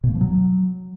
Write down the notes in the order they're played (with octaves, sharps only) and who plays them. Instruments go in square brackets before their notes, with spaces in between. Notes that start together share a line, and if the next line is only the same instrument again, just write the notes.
[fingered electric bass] B2
A#3
F3
F#3